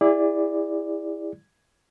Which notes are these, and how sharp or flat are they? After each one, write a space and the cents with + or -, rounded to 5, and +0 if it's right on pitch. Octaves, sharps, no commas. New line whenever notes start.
E4 +0 G#4 -40 D5 +0